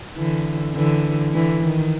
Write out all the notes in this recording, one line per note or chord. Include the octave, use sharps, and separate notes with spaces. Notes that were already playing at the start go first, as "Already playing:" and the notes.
D3 E3
D3 E3
D3 E3
D#3